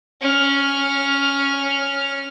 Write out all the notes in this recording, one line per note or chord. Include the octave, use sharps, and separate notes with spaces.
C#4 F6